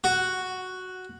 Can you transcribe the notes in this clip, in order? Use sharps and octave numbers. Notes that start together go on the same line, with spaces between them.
F#4